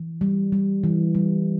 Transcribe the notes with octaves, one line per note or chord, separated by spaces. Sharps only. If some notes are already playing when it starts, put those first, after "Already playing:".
Already playing: E3
G3
G3
E3
G3